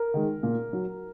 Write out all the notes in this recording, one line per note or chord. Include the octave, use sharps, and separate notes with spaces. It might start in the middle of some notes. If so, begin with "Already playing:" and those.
Already playing: A#4
D#3 G#3
A#2
F#3